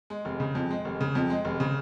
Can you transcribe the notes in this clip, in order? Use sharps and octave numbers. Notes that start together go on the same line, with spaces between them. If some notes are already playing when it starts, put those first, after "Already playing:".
G#3
F1
C#3
F2
G#3
F1
C#3
F2
G#3
F1
C#3